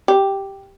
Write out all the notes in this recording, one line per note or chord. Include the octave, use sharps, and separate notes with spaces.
G4